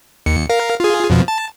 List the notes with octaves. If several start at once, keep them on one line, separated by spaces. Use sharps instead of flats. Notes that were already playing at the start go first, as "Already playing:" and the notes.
D#2 C#7
A#4 F5
F4 G#4
F2 B2 F3
A5